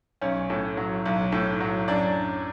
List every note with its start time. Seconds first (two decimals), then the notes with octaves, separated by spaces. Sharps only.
0.21 B1 C#4 C#5
0.50 A2
0.77 F#3
1.06 B1
1.32 A2
1.61 F#3
1.88 F#2 D4 D5